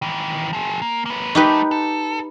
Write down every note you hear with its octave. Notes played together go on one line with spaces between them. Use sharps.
D#3 E3
F3 G#4
A#3
A#3 B4
F3 A3 D#4 G4 B4
A4